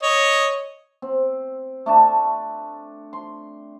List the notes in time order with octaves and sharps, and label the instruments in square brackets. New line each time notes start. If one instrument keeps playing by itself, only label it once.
[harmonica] C#5 D#5
[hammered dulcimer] C4
A3 D4 A5
C6